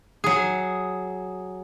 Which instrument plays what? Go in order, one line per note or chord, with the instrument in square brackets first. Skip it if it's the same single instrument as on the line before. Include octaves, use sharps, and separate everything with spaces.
[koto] F#3 G#4